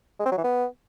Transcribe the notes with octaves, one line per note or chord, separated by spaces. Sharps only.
G#3
C4
F#3
E3
B3